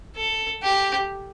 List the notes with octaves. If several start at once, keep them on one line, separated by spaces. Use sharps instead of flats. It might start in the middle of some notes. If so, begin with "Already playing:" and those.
A4
G4